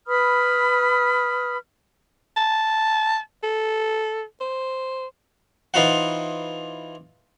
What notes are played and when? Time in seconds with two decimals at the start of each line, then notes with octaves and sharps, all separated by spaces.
0.07 B4 B5 D#6 F6
2.37 A5
3.43 A4
4.41 C5
5.74 E3 D#4 F4 C5 F#5